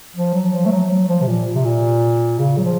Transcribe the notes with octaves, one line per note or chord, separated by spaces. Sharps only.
F3
F#3
F3
A3
F#3
F#3
F3
C3
A#2
C3
A#2
C#3
F#3
F3